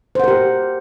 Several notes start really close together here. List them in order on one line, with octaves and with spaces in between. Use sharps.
C5 F#5 A#4 G4